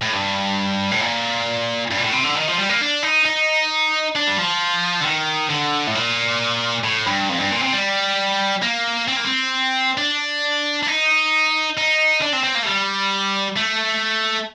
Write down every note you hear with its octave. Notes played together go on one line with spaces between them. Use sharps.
A2
G2
A2
A#2
G2
A#2
A2
C3
D3
D#3
F3
G3
A#3
D4
D#4
D#4
D4
G3
F3
D3
D#3
D3
A2
A#2
A2
G2
F2
G2
A#2
C3
G3
A#3
C4
A#3
C4
D4
D4
D#4
D#4
D4
C4
C4
A#3
A3
G3
A3